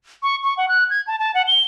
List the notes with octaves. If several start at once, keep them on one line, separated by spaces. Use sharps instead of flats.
C#6
C#6
F#5
F#6
G#6
A5
A5
F#5
G7